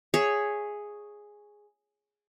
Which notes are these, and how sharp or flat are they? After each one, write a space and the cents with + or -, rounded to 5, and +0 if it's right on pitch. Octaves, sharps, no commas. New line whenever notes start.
G#4 +0 C#5 +0 E5 +5